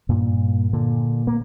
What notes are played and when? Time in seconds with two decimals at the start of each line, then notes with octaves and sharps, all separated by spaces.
0.09 G2 A#2
0.73 A#2 D3
1.27 A#3